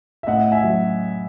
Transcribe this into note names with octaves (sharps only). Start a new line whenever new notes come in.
E5
A2 D#5 F#5
E5 G#5
F#3